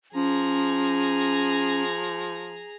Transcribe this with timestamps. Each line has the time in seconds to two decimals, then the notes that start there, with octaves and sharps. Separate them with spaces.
0.15 F3 C#4 G#4 A#5